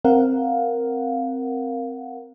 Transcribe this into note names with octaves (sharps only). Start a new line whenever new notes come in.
C4 A#4 F5 F#5